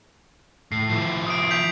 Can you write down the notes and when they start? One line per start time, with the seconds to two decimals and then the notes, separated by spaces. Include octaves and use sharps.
0.72 A2 C7
0.89 F3 E4
1.27 D#6 D7
1.51 G6 B6 F7